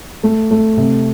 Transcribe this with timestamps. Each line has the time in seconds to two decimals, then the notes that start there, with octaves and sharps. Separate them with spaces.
0.23 A3
0.51 A3
0.77 C3